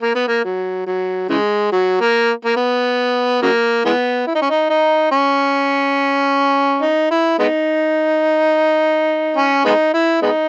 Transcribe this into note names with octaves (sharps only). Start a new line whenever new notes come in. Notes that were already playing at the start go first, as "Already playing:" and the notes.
A#3
B3
A#3
F#3
F#3
C#3 E3 G#3
F#3
A#3
A#3
B3
C#3 F#3 A#3
E3 G#3 B3
E4
D#4
C#4
D#4
D#4
C#4
D#4
E4
G#3 B3 D#4
C#4
G#3 B3 D#4
E4
G#3 B3 D#4